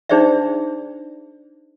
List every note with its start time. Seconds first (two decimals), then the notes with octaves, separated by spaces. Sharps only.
0.09 D4 D#4 G#4 C5 D5 E5